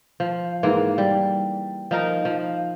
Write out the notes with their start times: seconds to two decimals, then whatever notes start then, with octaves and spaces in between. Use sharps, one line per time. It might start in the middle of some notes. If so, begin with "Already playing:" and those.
0.20 F3
0.63 G#2 E3 A#3
0.98 G3
1.91 F3 D#4 A#4
2.25 F3